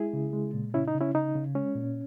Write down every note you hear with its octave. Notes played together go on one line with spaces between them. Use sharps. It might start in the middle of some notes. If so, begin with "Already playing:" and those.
Already playing: G#3 E4 G#4
C#3
G#3
A#2
C#3 C#4 E4
D#4
C#3
C#4 E4
C#3 D#4
C#3
G#3 C#4
A#2